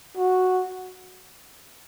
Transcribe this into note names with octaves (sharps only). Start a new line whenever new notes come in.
F#4